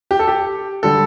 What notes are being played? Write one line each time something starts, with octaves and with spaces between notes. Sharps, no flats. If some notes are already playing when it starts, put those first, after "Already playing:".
G4
A4
G4
D3 G3 A4